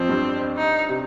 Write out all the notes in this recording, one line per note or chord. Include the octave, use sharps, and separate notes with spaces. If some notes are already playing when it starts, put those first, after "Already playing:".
Already playing: F2 F3 C4
G2 G3
D#4
C3